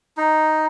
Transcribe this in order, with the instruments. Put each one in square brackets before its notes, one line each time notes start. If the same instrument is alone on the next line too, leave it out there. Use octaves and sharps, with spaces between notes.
[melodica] D#4